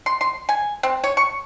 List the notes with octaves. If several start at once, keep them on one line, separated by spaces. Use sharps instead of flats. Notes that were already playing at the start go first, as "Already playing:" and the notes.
C6
C6
G#5
C4
C#5
C#6